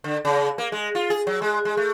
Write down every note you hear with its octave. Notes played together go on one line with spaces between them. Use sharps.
D3
C#3
A#3
G#3
F4
G#4
F#3
G#3
G#3
A3